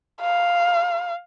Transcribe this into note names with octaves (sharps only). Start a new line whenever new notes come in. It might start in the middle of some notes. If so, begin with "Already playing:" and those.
F5